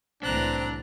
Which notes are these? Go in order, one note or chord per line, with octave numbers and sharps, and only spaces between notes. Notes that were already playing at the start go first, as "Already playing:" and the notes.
C2 A2 E3 C4 D4 A#5 F#6